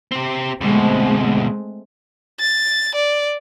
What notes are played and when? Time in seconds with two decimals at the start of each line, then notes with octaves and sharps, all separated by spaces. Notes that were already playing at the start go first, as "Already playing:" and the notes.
0.12 C4 G4
0.61 D2 B2 G#3 A3 C4
2.40 A6
2.95 D5